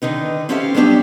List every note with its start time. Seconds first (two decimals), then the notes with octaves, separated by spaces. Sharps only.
0.02 D3 D#3 D#4 B4
0.49 C4 C#4 G4 A4 E5 F5
0.74 F#3 G3 B3 D4 G4